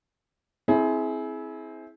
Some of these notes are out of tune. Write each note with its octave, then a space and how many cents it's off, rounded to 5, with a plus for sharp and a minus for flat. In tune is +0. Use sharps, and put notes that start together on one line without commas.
C4 +0 E4 -20 G#4 +20